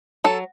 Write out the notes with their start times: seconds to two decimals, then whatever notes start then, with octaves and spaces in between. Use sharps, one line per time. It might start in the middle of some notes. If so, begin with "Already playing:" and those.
0.24 F#3 A4